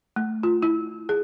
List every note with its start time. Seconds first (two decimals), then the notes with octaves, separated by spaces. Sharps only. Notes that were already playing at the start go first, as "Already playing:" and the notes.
0.16 A3
0.43 F4
0.62 E4
1.09 G#4